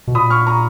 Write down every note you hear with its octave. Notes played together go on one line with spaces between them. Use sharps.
B2
A#2 B5 D#6
C#6 F6
A#5 C#6